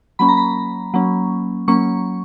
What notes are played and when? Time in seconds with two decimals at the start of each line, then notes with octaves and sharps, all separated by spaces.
0.19 F#3 A#3 C#4 B5
0.28 A#5
0.37 B5
0.94 F#3 A#3 C#4
1.68 F#3 A#3 C#4 C#6